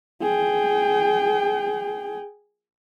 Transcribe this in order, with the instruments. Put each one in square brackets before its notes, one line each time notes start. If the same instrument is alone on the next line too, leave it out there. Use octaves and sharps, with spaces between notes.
[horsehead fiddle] G#4 G5